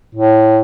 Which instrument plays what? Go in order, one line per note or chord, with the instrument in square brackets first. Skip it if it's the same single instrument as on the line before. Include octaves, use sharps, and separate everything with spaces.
[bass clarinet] A2